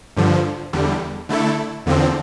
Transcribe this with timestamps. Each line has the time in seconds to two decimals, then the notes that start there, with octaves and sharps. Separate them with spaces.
0.16 G2 D3 F3
0.73 E2 D3 G3
1.29 D3 A3 E4 A4
1.86 E2 D3 F3 C4